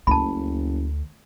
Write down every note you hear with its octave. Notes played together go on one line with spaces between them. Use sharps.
F#1 D2 A5 B5